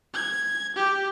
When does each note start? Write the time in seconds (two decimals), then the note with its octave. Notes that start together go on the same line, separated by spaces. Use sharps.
0.14 G#6
0.76 G4